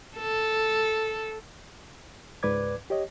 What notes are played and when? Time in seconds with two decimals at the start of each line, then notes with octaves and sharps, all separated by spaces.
0.18 A4
2.43 C#2 G#2 B4 D5 D6 G#6
2.90 G4 C#5 D#5